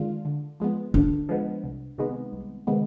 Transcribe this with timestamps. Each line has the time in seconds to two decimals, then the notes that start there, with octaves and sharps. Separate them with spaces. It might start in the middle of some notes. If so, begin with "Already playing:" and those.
Already playing: D#3 G#3 D4 F4
0.25 D3
0.60 F3 G#3 B3
0.94 D3 D4
1.29 F3 G#3 B3
1.64 C2
1.98 C3 D#3 G#3 B3
2.33 C2
2.67 C3 D#3 G#3 B3